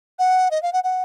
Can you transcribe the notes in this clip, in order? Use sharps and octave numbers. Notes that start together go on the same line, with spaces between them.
F#5
D#5
F5
F#5
F#5